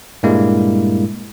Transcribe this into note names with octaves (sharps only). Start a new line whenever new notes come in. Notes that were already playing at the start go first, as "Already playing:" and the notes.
G2 A#2 G3 G#3 A#3 E4